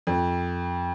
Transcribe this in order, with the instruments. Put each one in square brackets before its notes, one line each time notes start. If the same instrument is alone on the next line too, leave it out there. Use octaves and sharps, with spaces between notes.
[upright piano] F2